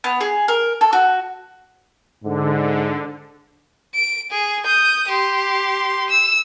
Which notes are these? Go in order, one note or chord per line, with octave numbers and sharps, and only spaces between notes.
B3
G#4
A#4
A4
F#4
G#2 D3
D7
G#4
D#6 G6
G4 C6
E6